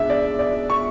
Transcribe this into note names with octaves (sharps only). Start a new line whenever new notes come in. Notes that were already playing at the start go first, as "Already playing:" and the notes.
Already playing: B2 G#3 B3 D4 E5
D5
D5
C#6